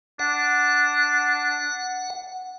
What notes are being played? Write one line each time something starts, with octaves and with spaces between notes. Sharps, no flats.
D4 F#5